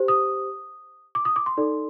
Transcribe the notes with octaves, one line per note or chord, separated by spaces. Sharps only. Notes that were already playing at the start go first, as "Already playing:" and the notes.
Already playing: G4 C5
D#6
D6
D#6
D6
C6
D#4 A4 D5